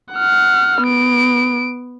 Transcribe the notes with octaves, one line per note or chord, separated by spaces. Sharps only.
F#5 F6
B3 D7